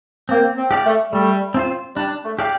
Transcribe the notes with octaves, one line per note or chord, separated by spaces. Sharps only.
A#3 C4
C4
G4 D5 F5
A3
G3 A3
C4 F4 C5
G3 D4
A3
G4 D5 F5